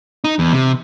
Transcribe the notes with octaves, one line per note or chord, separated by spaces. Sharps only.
D#4
E2
C3